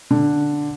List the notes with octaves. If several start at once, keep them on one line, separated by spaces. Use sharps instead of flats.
D3